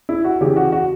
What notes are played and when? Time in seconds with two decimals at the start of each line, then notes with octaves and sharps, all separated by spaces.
0.09 E4
0.24 F#4
0.41 C#3 E3 G4
0.56 F#4
0.72 F#4